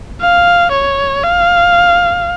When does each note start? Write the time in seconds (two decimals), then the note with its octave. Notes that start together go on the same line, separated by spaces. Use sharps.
0.21 F5
0.72 C#5
1.24 F5